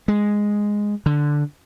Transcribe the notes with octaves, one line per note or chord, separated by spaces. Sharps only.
G#3
D3